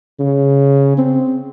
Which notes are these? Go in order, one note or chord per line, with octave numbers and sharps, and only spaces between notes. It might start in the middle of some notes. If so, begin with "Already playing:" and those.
C#3
C4